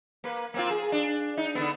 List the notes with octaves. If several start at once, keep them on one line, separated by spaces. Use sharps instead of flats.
A#3 B4
A#3 C4 F4
G#4
D4
D#4
D3 B3